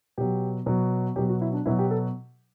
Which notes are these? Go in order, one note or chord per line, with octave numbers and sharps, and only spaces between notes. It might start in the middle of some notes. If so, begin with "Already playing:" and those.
B2 F#3 G4
B2 F#3
B2 F#3 G4
F#4
E4
D4
B2 F#3 E4
G4
A4